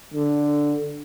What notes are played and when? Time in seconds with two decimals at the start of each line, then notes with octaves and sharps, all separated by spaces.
0.14 D3